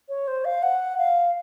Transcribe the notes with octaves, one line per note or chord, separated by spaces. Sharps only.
C#5
C5
F5
F#5
F5